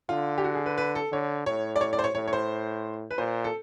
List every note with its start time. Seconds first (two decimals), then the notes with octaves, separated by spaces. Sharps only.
0.09 D3 F4
0.38 G4
0.44 F#4
0.55 G#4
0.66 B4
0.78 B4
0.95 A4
1.12 D3 C#5
1.46 A2 C#5
1.76 D5
1.81 C#5
1.93 D5
1.99 C5
2.04 C#5
2.15 A2 C#5
2.28 C#5
2.33 C5
3.11 B4
3.18 A#2 C5
3.44 A4